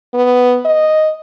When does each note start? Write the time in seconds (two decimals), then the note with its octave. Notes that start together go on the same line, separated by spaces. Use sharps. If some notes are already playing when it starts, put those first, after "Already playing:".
0.14 B3
0.65 D#5